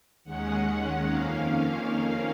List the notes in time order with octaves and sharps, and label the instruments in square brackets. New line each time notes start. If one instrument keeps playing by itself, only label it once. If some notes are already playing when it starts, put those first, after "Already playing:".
[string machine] D#2 D#3 G#3 C#4 F#5
F2 D#3 A#3 C#4 F5
F5